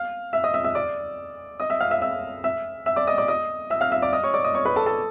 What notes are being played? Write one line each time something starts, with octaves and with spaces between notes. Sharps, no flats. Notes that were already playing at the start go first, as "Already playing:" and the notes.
Already playing: F5 F6
E5 E6
D#5 D#6
E5 E6
E5 E6
D5 D6
D#5 D#6
E5 E6
F5 F6
E5 E6
E5 E6
E5 E6
E5 E6
D5 D6
D#5 D#6
D5 D6
D#5 D#6
E5 E6
F5 F6
E5 E6
D5 D6
D#5 D#6
C#5 C#6
D5 D6
D#5 D#6
C#5 C#6
B4 B5
A4 A5
A4 A5